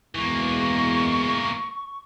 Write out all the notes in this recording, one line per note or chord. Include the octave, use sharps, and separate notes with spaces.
E2 B2 E3 G#3 A#3 C#6